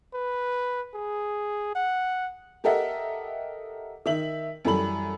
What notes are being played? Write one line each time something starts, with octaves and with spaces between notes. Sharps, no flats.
B4
G#4
F#5
G4 A4 A#4 D#5 E5 F#5
D#3 E5 F#7
F#2 E3 G3 A4 B5 F#7